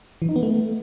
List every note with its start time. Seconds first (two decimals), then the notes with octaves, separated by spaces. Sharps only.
0.22 E3
0.29 D#4
0.36 B3
0.43 A3